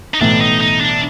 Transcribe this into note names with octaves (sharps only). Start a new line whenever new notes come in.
D#4
B1 A2 E3 A3 D4
D#4
D#4
D4